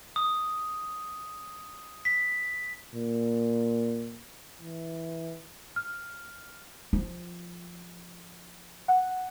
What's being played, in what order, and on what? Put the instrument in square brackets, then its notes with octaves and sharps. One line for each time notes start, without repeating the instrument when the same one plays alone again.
[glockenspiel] D#6
B6
[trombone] A#2
E3
[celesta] F6
[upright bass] F3 F4
[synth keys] F#5